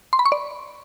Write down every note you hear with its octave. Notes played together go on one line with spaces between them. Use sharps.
C6
B5
C#6
D5